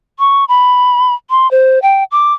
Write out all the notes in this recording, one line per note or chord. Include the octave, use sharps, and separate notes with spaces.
C#6
B5
C6
C5
G5
D6